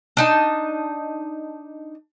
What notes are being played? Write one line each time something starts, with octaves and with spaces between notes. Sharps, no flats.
D4 D#4 A5